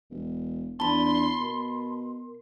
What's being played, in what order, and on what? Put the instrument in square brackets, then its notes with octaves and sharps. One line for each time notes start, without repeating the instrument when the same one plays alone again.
[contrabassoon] E1
[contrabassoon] E2 [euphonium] D4 [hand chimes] A5 B5 [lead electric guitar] C6
[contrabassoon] B2 [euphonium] A#4